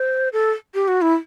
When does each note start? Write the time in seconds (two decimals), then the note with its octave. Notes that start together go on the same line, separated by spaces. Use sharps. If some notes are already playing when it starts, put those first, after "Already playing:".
Already playing: C5
0.33 A4
0.75 G4
0.88 F#4
1.02 E4